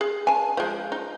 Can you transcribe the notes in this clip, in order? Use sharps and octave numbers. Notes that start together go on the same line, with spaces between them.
G#4
G#5 A5
F3 G#3
D#4